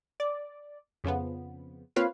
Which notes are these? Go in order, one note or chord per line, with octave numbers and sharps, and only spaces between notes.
D5
F2 C#3 F3 B3
A#3 C4 F4 B4 C#5 F5